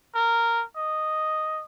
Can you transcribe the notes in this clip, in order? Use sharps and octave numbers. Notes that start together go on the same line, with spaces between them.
A#4
D#5